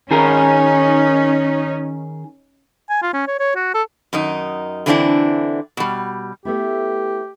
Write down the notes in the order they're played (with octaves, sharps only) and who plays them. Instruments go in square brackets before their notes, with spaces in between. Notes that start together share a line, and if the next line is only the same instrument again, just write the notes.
[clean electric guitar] D#3 G#4 A#4 [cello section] C#4 D#4
[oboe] G#5
F4
C#4
C#5
C#5
F#4
A4
[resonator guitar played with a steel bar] F#2 D#3 D#4
D3 E3 A3 C4 D4 E4
B2 G3
[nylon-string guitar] A3 B3 E4 [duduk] G4